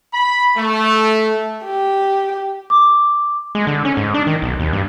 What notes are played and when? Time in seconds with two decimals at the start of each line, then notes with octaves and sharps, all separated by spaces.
0.14 B5
0.57 A3
1.64 G4
2.70 D6
3.55 G#3
3.67 D3
3.85 C#4
3.97 G#2
4.14 D4
4.27 D#3
4.42 B1
4.60 D#2
4.73 G2